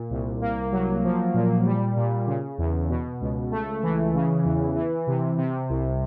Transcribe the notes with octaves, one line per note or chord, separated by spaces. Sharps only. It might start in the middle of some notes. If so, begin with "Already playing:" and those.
Already playing: A#2
C2
A#3
F#3
F3
A#2
G3
A#2
C#3
E2
B2
C#2
A3
E3
C#3
E2
E3
C3
C3
C2